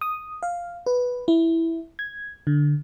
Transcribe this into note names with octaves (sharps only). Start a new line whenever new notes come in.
D#6
F5
B4
E4
G#6
D3